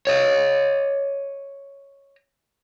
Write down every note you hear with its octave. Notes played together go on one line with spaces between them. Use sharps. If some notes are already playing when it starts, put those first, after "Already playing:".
C#5 D#5